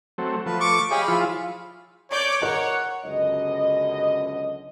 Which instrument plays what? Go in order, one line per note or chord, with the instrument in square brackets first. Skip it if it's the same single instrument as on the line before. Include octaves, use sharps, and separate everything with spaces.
[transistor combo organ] F#3 A3 C4
[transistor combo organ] F3 A3 [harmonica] B4
[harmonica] C#6 D6
[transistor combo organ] G4 C#5 D#5 [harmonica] G#4 F5 B5
[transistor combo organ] F3 E4 F4
[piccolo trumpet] C#5 [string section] D5 D6 G6
[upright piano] A#4 D#5 A#5 [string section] C#5 [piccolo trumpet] F#5
[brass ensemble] C#2 F#2 B2 D3 D#5